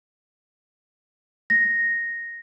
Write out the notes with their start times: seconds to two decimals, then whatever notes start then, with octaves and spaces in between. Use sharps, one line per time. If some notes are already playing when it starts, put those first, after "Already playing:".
1.50 A#6